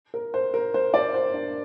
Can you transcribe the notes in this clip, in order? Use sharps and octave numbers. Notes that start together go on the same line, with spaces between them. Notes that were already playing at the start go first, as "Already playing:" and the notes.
A#4
C5
A#4
C5
D5
C5
D4